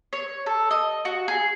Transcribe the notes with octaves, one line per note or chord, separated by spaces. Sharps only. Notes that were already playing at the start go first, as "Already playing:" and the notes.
C#5
A4
D#5
F#4
G#4